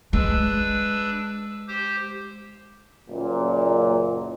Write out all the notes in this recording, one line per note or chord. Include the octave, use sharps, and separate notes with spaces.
G#3 D4 B4 E6
G4 C5
F#1 A#2